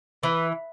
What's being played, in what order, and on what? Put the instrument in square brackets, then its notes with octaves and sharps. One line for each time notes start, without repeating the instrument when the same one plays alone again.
[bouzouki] E3 [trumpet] B4